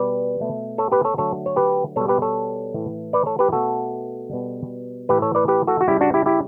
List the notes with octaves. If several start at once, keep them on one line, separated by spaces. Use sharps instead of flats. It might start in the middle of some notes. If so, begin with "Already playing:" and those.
Already playing: B2 G3 B4 D5
B2 A3
A4 C#5
G4 B4
A4 C#5
D3 F#3 A3 A4 C#5
C#5
G4 B4
B2 G3 A4 C#5
G4 B4
A4 C#5
A2 E3 A3
B4 D5
A4 C#5
G4 B4
B2 A3 F#4 A4
B2 G3
A2 E3 A3 G4 B4
A4 C#5
B4 D5
G4 B4
F#4 A4
F#4
C#3 G3 E4 G4
D4 F#4
E4 G4
E4 G4